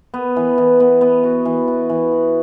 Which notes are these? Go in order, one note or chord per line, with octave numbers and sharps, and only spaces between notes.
B3
E3
E3
B3
B3
F#4
E3
F#4
E3
F#4